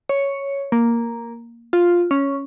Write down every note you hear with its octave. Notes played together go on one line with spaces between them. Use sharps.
C#5
A#3
F4
C#4